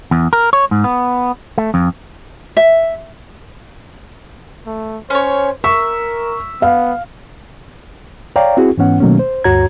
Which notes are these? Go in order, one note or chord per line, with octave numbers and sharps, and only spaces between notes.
E2
A#4
C#5
G#2
B3
A3
F2
E5
A3
C#4 C5 C#5
A#4 E5 C#6
B3 F5
C#5 D5 F5 G5 A#5
C4 E4 F#4 G#4
G#2 E3 B3 C#4 F#5
B2 D#3 F#3 A3 A#3 C#4
C5
D2 G2 F#4 C#5 A#5 G#6